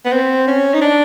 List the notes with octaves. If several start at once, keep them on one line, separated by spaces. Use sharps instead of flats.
B3
C4
C#4
D#4
D4